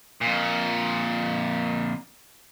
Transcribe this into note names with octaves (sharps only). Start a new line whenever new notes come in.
F2 A#2